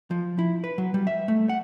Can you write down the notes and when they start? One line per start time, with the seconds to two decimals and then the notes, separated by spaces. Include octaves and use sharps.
0.11 F3
0.39 E4
0.64 B4
0.78 F#3
0.94 G3
1.07 E5
1.28 A3
1.49 F#5